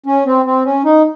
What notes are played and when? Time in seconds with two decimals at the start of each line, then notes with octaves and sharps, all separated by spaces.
0.06 C#4
0.26 C4
0.46 C4
0.65 C#4
0.85 D#4